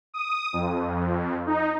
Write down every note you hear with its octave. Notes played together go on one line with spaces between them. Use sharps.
D#6
F2
D#4